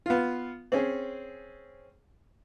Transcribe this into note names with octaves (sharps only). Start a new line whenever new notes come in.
B3 F4
C4 C#4 G#4